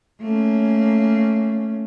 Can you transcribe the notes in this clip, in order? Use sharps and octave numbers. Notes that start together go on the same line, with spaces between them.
A3 A#3 C#4